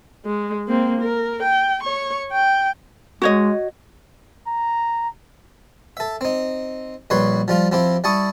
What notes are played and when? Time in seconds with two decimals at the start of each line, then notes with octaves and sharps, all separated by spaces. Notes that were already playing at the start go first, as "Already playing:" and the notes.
0.25 G#3
0.68 A#3 C4
1.01 A#4
1.43 G5
1.83 C#5 C#6
2.32 G5
3.22 G#3 F#4 C#5 D#5
4.47 A#5
5.97 A4 E5
6.21 C4 D#4
7.10 A#1 G3 B4 C#5 C6
7.48 F3 G3 F4
7.72 F3 C4 E4 G4
8.04 G3 E4 A5 C#6 D#6